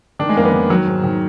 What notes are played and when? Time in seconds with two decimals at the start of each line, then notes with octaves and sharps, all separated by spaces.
0.19 D#3 D4
0.29 G#3
0.36 F2 A#3
0.45 B3
0.53 D#3
0.70 D#3 F#3
0.87 G#2
1.04 D#3